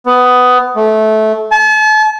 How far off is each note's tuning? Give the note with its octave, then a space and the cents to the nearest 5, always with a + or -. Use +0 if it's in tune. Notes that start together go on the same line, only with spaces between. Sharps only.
B3 +15
A3 -20
A5 -40